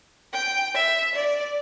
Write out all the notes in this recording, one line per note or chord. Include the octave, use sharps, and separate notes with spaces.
G5
E5
D5